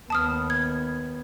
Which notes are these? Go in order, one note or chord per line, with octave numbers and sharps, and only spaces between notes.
D#2 B3 A5 D#6 F6
G#6